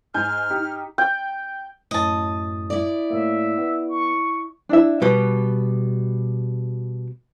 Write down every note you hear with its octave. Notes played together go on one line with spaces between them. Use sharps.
G#2 G#5 F6 G6
D#4 G4
G5
F#2 A2 D#5 A5
E4 D5
A2 A#3 E5
B3
C#6
D4 E4 E5
B2 G3 B4